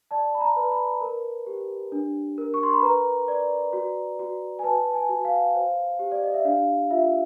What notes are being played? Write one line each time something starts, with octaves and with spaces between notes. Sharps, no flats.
D5 A5
B5
A#5
B4
B5
A#4
G4
D4
A#4
C#6
C6
B5
B4 A#5
D5
F#4
F#4
G#5
B4 A5
G#5
F#4
F5
C5
G4
D5
D#5
E5
D4 F5
F4 E5